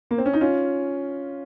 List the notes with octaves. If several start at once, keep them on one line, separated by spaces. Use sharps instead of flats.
A#3
C4
C#4
D#4
C#4 F4